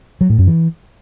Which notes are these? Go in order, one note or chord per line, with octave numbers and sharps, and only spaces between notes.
F#3
A2
F#2
E3